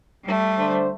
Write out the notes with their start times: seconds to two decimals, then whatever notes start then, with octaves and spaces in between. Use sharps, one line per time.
0.23 G3 A3
0.58 D3 D4 C5